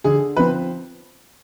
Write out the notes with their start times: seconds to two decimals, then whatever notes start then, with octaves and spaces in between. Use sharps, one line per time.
0.04 D3 G#4
0.37 F3 C4 B4